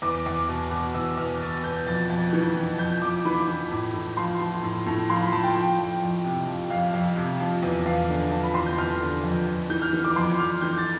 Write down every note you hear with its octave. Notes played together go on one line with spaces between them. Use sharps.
E2 D6
E2
B2
B2
E2 E6
E2 F6
B2 A6
B2 G6
F2 A6
F2
E3
E3
F2 G6
F2 D6
E3 B5
E3
A2
A2
F3 C6
F3
A2
A2
F3 C6
B5
F3 A5
G5
F3
F2
F2
C3
F3
F2 F5
F2 F5
C3
F3
E2
E2 F5
D3
F3 A5
B5
E2 C6
G6
E2 F6
D3
F2
F2
E3 G6
F6
E3
D6
F2 C6
F2 F6
E3 G6
A6